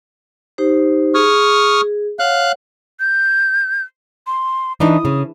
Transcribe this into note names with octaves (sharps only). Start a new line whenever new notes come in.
D#4 G4 C5
G#4 C#6 D#6 F6
C#5 F5 F#5 F#6
G6
C6
E3 D4 D#4 D#6
C#3